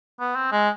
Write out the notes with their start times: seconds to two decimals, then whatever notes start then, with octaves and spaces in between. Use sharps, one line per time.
0.20 B3
0.36 C4
0.52 G#3